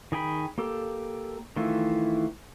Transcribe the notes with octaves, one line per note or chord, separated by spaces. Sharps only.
D#3 G#4 G5 B5
A#3 G4 A4
D#3 E3 A3 E4 F4